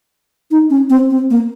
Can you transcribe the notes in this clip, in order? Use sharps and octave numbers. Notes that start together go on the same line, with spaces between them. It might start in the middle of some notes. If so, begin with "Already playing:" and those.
D#4
C#4
C4
C4
A#3